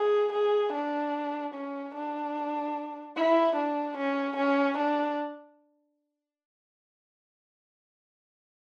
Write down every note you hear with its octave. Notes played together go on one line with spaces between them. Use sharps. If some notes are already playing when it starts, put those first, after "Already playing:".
Already playing: G#4
G#4
D4
C#4
D4
E4
D4
C#4
C#4
D4